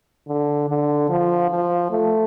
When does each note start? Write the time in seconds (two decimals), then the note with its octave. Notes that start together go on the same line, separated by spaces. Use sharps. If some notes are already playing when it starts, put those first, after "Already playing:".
0.28 D3
0.69 D3
1.09 F3
1.50 F3
1.91 A3